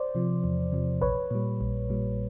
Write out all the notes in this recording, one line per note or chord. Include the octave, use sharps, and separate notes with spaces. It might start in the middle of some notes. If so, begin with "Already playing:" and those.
Already playing: C5 D5
C3 F3
E2
C3 F3
A#1 B4 C#5
A#2 G3
A#1
A#2 G3